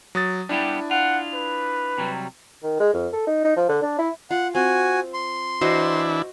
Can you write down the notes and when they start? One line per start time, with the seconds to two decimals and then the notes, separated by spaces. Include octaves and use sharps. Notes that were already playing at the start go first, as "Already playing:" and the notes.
0.15 F#3 D#6 A6
0.49 G3 B3 D4 E4 G4
0.91 F4 F#5
1.34 B4
1.98 C3 F#3 G3
2.63 D#3
2.80 G#3
2.93 F2
3.13 A4
3.27 D#4
3.44 D#4
3.56 F3
3.69 D3
3.82 D4
3.98 E4
4.31 F4 F#5
4.55 C4 F#4 G#5
5.14 C6
5.61 E3 D4 E4 F#4 C5 D#5